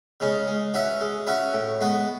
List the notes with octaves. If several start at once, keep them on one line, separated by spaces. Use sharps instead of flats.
C#3 G#3 C#4
G#3
C#4 F#4 B4 E5
G#3
C#4 F#4 B4 E5
A2
G#3 B3 F#4 B4